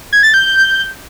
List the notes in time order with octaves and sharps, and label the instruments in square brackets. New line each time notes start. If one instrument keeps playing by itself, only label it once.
[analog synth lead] G#6
A6
G6